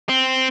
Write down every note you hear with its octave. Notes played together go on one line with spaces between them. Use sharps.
C4